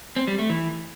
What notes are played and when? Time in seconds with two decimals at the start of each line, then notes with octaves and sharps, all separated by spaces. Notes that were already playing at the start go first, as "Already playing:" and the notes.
0.16 C4
0.27 G3
0.39 A3
0.50 E3